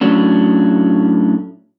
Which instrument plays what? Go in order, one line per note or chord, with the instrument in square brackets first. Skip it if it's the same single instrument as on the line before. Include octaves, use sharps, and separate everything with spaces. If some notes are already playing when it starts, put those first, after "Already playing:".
[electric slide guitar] A2 F#3 A3 C#4 D4